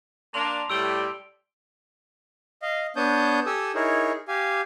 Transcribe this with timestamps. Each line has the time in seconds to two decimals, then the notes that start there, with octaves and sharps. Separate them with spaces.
0.34 A#3 D4 A5 C6 F7
0.70 A2 G3 E6 D7 G7
2.62 D#5 F5
2.96 B3 D4 C#5 A5 D#6 G6
3.46 G4 A4 G#5 D#6 E6
3.75 D#4 E4 G#4 A#4 C#5
4.28 G4 F5 G#5